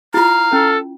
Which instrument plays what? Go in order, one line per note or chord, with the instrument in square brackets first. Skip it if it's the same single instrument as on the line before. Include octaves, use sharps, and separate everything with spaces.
[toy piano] E4 F4 [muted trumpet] F5 [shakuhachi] A#5
[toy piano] C#4 [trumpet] A4